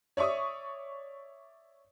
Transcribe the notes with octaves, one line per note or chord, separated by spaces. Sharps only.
C#5 D5 E5 C#6 D#6